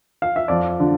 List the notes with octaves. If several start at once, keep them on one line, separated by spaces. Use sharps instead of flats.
F5
E5
F2 D5
D3